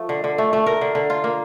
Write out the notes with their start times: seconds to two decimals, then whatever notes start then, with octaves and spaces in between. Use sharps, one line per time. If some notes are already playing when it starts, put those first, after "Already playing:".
Already playing: F3 A3
0.09 D3
0.24 D3
0.38 A3
0.53 A3
0.66 A#4
0.81 D3
0.95 D3
1.10 F4
1.24 A#3